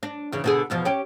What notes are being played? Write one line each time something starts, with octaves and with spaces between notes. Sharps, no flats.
D4
E2 C#3
B2 D3 G#4
E2 B2 F3
C#4 G4